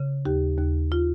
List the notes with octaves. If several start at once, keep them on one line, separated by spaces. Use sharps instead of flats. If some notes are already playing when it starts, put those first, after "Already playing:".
Already playing: C#3
D#2 G4
D#2
F4